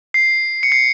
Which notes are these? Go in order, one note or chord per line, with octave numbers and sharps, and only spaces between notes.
C7
C#7
C7